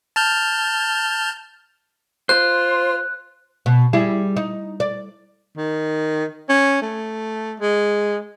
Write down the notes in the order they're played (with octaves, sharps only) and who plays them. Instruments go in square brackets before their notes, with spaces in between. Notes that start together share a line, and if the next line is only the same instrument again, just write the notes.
[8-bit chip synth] A5 F6 G6
[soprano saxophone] F4 [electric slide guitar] C5 [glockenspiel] F#6
[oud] B2
G3 E4 G#4
D#4
D5
[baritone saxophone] D#3
C#4
A3
G#3